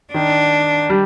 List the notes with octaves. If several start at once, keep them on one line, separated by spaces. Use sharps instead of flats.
D#3 D4
G3